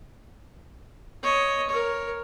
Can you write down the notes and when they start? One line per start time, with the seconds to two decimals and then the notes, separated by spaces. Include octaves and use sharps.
1.23 C#5 D#5
1.69 A#4 C#5